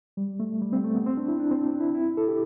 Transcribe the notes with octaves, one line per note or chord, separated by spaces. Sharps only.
G3
A3
G3
C4
A3
B3
C4
D4
E4
D4
C4
D4
E4
E4
A4
G4